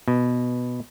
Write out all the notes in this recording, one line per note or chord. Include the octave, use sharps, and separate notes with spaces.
B2